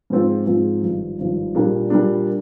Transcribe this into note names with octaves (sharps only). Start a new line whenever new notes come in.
G#2 F3 C4 F4
G#2 F3 C4 F4
G#1 G2 F3
G#1 G2 F3
A#2 G3 A#3 D4
A#2 G3 A#3 D4